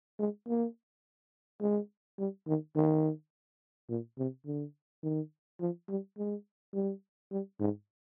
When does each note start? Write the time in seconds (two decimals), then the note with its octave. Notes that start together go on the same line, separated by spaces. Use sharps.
0.19 G#3
0.48 A#3
1.61 G#3
2.19 G3
2.48 D#3
2.76 D#3
3.90 A#2
4.18 C3
4.46 D3
5.03 D#3
5.60 F3
5.89 G3
6.18 G#3
6.74 G3
7.32 G3
7.61 G#2